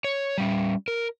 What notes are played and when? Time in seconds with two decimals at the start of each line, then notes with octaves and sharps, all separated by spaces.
0.04 C#5
0.38 G3 C#4
0.88 A#4